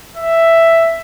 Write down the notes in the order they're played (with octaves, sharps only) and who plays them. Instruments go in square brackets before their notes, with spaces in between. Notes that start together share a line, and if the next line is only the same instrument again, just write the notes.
[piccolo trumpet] E5